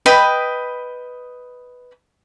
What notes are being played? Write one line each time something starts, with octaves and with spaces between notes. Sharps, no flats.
B4 D#5 G5 B5